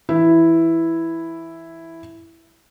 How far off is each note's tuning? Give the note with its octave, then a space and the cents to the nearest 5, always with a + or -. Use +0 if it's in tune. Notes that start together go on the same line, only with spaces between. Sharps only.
E3 +0 E4 +0